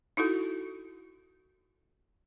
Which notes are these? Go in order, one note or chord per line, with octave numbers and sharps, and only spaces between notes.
D#4 E4 F#4 A4